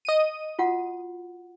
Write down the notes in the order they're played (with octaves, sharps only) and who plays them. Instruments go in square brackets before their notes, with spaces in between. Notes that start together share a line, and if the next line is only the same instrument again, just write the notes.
[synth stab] D#5 D#7
[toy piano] F4 F#4 F#5